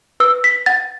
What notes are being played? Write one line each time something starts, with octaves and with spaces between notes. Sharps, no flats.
B4 E6
B6
F#5 A6